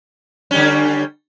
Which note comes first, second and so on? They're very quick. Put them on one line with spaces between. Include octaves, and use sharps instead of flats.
C#4 G3 D3